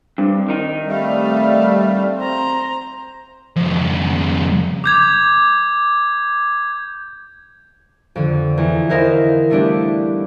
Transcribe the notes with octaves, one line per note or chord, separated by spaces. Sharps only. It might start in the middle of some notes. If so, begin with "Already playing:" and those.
G2 C4
D#3 D#4
G3 A3 E5 F5
C5 A#5
F2 C#3
D6 G6 G#6
F2 D3
E2
D#4 E4 A#4 C5 D#5 F5
G3 A3 B3 D4 E4 G4